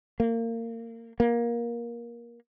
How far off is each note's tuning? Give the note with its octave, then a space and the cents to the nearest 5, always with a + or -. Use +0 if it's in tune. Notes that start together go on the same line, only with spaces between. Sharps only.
A#3 -25
A#3 +20